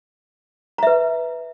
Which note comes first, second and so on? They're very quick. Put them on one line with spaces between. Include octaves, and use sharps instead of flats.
A#5 E5 B4